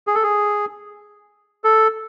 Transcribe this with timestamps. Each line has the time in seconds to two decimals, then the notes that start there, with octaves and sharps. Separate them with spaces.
0.07 G#4
0.15 A4
0.23 G#4
1.64 A4